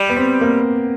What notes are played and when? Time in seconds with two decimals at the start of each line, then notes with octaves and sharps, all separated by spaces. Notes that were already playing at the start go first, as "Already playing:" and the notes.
Already playing: G3
0.09 B3
0.17 C4
0.41 A#3